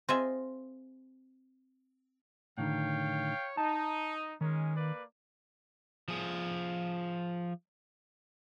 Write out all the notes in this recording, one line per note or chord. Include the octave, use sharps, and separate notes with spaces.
C4 F4 G#4 D#5 E5
A2 D3 D#3 C#5 F5 G5
D#4 A5
D#3 G#3 C#4 A#4
A#3 B4 D5
F3 G#4